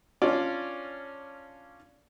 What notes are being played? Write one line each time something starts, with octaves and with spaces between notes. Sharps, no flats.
C#4 D4 F4 D5